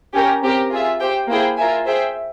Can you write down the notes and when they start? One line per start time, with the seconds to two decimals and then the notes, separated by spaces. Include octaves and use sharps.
0.13 C#4 G4 A#4
0.42 C4 G4 A#4
0.70 F4 G#4 E5
0.99 G4 C5 G5
1.28 A#3 E4 G#4 C5 G5
1.57 F4 A#4 E5 G#5
1.86 G#4 C5 E5 G5